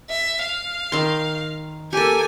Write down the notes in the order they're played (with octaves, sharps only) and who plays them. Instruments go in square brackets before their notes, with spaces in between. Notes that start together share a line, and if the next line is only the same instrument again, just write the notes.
[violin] E5
F5
[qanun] D#3 C6
[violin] A#3 G#5 [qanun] G4 A4